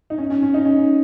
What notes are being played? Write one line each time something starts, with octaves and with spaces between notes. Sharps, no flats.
D#4
C#4
C#4
C#4
D#4
C#4